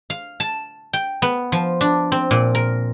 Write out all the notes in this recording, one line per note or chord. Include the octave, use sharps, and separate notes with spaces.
F5
A5
G5
B3
F3
D4
C4
A#2
A#4